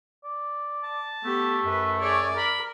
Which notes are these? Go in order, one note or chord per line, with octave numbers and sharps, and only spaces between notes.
D5
A5
A3 B3 G4 A4
F#2 B4
G#4 C#5 D5
A#4 B5